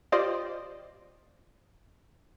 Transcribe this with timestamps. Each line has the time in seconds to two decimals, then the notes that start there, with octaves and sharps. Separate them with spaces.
0.12 F4 G4 C5 D5 D#5